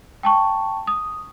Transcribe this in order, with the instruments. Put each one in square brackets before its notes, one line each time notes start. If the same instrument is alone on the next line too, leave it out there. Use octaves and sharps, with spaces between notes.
[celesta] G5 A5 C#6
D#6